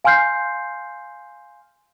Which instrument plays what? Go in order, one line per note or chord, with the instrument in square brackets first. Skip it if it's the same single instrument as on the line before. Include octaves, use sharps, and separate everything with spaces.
[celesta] F5 G#5 C6 F6 G6 C7